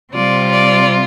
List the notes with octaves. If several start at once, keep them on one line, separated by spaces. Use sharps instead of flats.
C3 G3 C4 F4 D5
D5